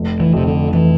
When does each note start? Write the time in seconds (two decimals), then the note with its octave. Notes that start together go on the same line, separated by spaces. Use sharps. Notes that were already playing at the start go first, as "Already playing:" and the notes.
Already playing: F1
0.20 E3
0.33 F2 C3
0.47 D3
0.73 E3